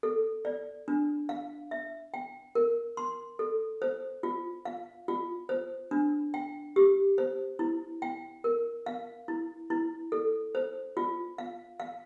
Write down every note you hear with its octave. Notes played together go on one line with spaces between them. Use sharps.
A4
D5
D4
F5
E5
G5
A#4
C6
A4
C5
F4
F5
F4
C5
D4
G5
G4
C5
E4
G5
A#4
F5
E4
E4
A4
C5
F4
F5
F5